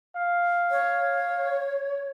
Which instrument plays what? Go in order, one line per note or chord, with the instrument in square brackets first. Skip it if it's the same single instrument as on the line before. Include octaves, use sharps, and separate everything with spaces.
[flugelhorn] F5
[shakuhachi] C#5